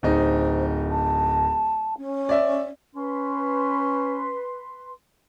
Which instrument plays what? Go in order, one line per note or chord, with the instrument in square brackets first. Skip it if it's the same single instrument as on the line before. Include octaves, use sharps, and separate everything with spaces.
[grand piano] D1 D#4 [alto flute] C5
[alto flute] A5
C#4
[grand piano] D5 E5
[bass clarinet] C#4 [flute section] B4 C6